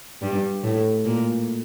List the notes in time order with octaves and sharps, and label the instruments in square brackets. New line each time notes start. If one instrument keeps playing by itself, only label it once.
[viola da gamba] G2 G3
A2 A3
A#2 A#3